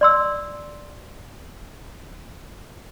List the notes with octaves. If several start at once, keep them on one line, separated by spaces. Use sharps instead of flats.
D5 C6 E6